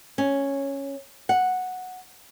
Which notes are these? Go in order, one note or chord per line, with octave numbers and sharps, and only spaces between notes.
C#4
F#5